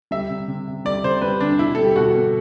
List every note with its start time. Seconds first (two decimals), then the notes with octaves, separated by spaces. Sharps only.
0.11 G3 E5
0.30 C3
0.48 C3
0.67 C3
0.85 G3 D5
1.04 C3 C5
1.22 G3 B4
1.40 C3 D4
1.59 B2 E4
1.75 G3 A4
1.85 G4
1.96 B2 F#4
2.14 B2